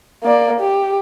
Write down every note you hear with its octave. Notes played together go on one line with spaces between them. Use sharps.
A#3 D5
G4